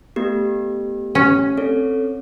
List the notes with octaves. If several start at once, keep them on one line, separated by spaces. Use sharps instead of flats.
A3 B3 G4
C#4
C4 A4 C#5